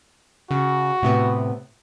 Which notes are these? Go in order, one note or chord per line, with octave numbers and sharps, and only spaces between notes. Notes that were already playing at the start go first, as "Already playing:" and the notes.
C#3 F#4
A2 C3 B3